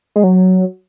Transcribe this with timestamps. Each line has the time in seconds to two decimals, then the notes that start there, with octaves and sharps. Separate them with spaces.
0.16 G#3
0.24 F#3